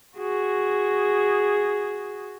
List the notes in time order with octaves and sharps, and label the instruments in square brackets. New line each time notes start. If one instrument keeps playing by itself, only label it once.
[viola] F#4 G#4